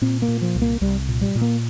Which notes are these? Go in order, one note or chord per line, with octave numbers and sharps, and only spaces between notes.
A#2 C4
A#3
A#2
F3
C2
A#3
C2 G3
A#2
G3
A#2
A#3